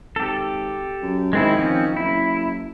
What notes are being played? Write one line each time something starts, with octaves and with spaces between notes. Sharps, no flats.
G#1 G4 A4
F#2
D#3 G#3 C4 E4
F3 C4 C#4
F#1 E4